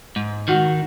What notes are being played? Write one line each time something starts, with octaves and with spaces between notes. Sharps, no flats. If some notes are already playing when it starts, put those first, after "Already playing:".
G#2
D#3 F#4